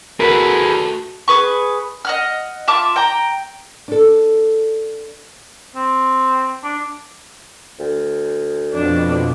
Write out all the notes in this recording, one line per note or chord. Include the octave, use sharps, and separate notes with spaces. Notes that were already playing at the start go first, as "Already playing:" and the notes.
A3 F#4 G#4 A#4 B4 F#5
G#4 B4 C#6
D#5 F#5 F6
F4 E5 A5 D6
G5 A#5
D4 A4
C4
D4
D2
F2 B2 D4